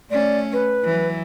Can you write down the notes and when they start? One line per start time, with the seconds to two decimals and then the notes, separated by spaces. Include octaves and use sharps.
0.11 A3 C#4 D5
0.53 B4
0.85 E3 F#3